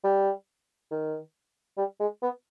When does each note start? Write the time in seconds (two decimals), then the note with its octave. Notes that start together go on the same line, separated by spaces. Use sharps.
0.04 G3
0.91 D#3
1.78 G3
2.00 G#3
2.22 B3